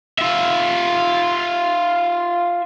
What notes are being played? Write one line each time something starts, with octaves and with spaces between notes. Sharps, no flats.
F4 E5